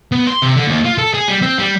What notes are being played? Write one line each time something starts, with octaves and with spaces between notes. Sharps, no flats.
B3
C6
C3
D3
D#2
F4
A4
G#4
G3
C4
G3